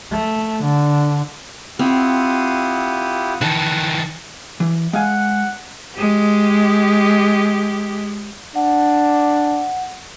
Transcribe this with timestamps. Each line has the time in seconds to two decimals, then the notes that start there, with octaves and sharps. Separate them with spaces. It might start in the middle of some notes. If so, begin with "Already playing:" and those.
0.11 A3
0.63 D3
1.79 C4 E4 F4 G4 F#5 D#6
3.41 D#3 E3 F#5 A5
4.60 E3
4.93 G#3 F5 F#5 G#5
5.94 G#3 G4
8.55 D4 F#5